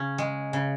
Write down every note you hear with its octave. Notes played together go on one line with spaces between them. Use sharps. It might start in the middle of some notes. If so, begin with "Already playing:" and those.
Already playing: C#3 C#4
G#3
C#3